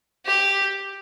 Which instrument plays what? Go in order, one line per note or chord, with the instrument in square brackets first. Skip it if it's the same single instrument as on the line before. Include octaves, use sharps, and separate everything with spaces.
[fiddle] G4